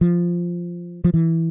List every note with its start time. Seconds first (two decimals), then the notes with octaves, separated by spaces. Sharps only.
0.01 F3
1.04 F3
1.14 E3